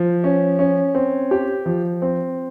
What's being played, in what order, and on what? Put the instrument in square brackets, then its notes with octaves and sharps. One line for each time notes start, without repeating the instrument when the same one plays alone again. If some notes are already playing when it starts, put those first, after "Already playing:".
Already playing: [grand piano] F3
C#4
C#4
C4
G4
F3
C4